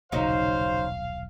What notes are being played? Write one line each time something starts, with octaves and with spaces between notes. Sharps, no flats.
D#1 B1 C#3 F#3 D#4 C5 F5